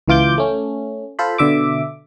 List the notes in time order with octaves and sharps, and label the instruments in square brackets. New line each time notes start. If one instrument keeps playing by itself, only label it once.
[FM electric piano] C#2 E3 F4 D6 G6
A3 C#4
F4 A4 C5 B5
B2 D3 E5 D6